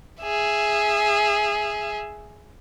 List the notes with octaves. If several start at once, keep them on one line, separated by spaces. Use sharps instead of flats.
G#4 E5